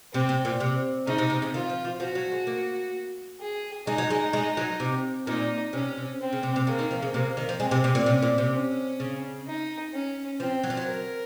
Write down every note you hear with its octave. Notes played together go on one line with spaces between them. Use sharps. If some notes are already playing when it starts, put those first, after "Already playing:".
C3 C4
C3
A#2
C3
C#3 D#4
C3
C3
C#3
D#3 F4
F3
F3
F3 F#4
F#3
G#3
A#3
G#4
G#3 D#4
F#3
G#3
G#3
F#3
C3
A#2 D#4
C3 C#4
C3
C4
C#3
C3
C3
C#3 A#3
D#3
F3
C#3
C3 A#3
D#3
F3
G#3 C4
C3
C3
A#2
C3 C#4
A#2
C3
C#4
C#3
D#4
C#4
F3 C4
F#3
F3
F#3
A#4